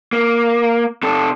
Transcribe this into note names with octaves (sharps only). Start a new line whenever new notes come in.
A#3
C3 A4